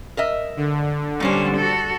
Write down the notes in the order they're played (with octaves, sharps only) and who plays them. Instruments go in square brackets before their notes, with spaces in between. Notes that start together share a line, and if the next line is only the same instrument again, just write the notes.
[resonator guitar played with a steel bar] A#4 D#5 E5
[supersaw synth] D3
[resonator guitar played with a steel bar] A#2 D4 C5 [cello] G3 C#4
[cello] F#4 A4